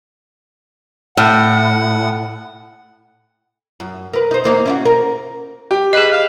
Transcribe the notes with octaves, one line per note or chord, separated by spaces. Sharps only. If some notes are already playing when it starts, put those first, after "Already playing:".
A2 F#5
F#2
A#4 B4
D#4 C5
E2 A#3 D#4
C#4 E4 F#4
A#4
G4
G#4 B4 D#5
F5